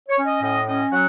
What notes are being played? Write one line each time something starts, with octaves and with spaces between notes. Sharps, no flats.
C#5
C#4
D#5
A2 D#5
C#4 D#5
F#3 F#5